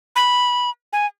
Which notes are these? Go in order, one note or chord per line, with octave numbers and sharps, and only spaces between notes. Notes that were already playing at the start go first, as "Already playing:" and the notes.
B5
G#5